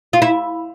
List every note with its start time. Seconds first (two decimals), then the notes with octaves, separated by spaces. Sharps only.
0.13 F4
0.22 E4